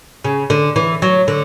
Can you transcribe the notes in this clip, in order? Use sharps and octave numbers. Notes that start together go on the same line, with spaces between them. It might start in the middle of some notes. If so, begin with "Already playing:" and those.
C#3
D3
E3
F#3
D3